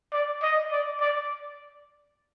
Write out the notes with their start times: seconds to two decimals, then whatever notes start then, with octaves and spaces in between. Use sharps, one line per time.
0.13 D5
0.42 D#5
0.72 D5
1.01 D5